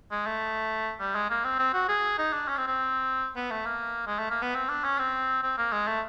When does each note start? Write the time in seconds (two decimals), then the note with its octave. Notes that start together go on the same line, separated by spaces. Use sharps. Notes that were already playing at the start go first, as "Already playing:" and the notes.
0.11 G#3
0.26 A3
1.00 G3
1.15 G#3
1.30 A#3
1.44 C4
1.59 C4
1.74 F#4
1.89 G#4
2.18 D#4
2.33 D4
2.48 C#4
2.57 C4
2.67 C4
3.36 B3
3.51 A3
3.66 A#3
4.07 G#3
4.19 A3
4.31 A#3
4.42 B3
4.55 C4
4.69 D4
4.84 C#4
4.99 C4
5.43 C4
5.58 A#3
5.72 G#3
5.87 A3